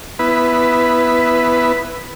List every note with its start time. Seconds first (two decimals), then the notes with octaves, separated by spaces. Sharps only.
0.19 B3 E4 B4